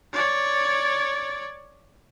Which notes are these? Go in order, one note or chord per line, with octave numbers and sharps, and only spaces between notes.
C#5 D5